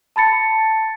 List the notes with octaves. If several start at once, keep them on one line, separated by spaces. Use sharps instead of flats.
A5 B5 A6 C#7